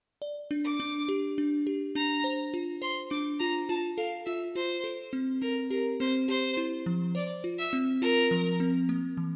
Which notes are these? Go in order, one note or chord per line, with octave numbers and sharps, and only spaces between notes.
D5
D4
D6
D4
G4
D4
G4
D4 A#5
C5
F4
C5 C6
D4 D6
F4 A#5
F4 A5
A4 F5
F4 E5
F4 C5
A4
C4
C4 A#4
G4 A#4
C4 C5
G4 C5
E4
F3
C5 D5
F4
E5
C4
F4 A#4
F3
C4
A#3
E3